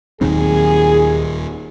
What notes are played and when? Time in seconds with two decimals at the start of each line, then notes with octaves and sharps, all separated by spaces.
0.21 D#1 D#2 D#3 F#3 C4 G#4